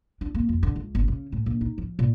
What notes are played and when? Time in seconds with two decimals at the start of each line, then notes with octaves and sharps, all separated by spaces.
0.21 D4
0.35 A#3
0.49 F2
0.63 D3
0.76 C#2
0.95 G1
1.08 C#3
1.32 A2
1.46 A#1
1.61 D#4
1.78 F3
1.99 A#2